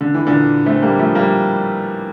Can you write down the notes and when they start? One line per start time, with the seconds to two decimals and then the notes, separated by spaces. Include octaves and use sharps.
0.01 D3
0.14 E3
0.27 A#2 D3
0.66 A3 C4
0.82 G3 A#3
0.99 F3 A3
1.15 G3 A#3